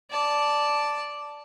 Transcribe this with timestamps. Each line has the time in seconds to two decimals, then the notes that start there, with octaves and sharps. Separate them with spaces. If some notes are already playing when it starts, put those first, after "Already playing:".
0.10 D5 A5